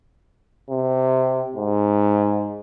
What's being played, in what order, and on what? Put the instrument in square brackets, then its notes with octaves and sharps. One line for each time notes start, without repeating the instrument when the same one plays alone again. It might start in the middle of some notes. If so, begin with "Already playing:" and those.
[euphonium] C3
G#2